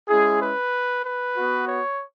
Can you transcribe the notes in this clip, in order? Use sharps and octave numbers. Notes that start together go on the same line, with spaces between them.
G#3 C#4 E4 G#4
B4
B4
B3 F#4
C#5